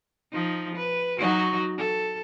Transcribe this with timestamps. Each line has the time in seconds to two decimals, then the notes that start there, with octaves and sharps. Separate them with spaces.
0.33 F3 D#4
0.76 B4
1.18 F#3 D#4 F#4
1.78 A4